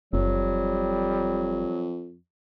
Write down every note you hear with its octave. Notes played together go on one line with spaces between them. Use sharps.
F#1 F2 F#3 G3